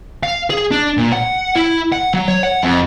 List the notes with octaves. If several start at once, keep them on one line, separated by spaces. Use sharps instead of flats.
F5
G#4
D4
A#2
F#5
E4
F#5
F#3
C#5
F#5
F2